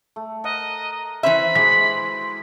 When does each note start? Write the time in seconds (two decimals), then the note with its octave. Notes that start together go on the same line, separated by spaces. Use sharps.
0.16 A3
0.44 A#4 D#5 F#5 A#5
1.23 E3 C#4 C5 E5 B5
1.55 E3 G#3 F#4 G4 B6